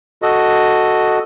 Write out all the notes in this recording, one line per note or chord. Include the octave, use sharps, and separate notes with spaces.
F#4 A4 D#5